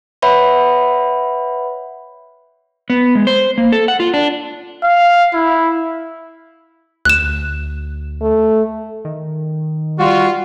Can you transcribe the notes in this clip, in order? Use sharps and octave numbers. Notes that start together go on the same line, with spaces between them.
B4 C#5 E5 F#5 B5
B3
G#3
C5
A#3
A4
F#5
F4
D4
F5
E4
D2 F#6 E7
A3
D#3
G3 F4 F#4